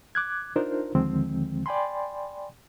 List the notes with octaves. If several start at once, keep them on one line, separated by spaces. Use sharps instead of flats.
D6 F#6 G#6
D4 D#4 F4 A#4 C5
D#2 D3 D#3 F3 G#3 C4
D5 G5 G#5 B5 C6